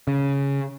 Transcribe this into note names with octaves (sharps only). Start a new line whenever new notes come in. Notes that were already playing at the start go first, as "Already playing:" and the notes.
C#3